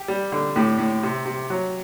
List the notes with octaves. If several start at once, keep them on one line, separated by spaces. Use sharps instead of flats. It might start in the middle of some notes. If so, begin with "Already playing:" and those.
Already playing: G4
G3
D3
A2 G4
A2
C3
C3
F#3